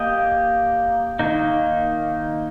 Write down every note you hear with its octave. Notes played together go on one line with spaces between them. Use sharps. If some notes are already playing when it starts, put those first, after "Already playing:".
Already playing: A#3 G4 D#5
D#3 A#3 D#4